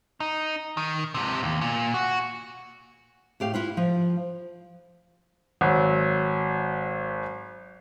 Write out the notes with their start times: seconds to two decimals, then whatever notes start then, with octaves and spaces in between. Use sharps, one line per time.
0.20 D#4
0.77 D#3
1.14 G#2 C3
1.43 D#2
1.61 A#2
1.94 F#4
3.40 A2 G4 F5
3.54 E4 F4 B4
3.77 F3
5.61 G#1 F#3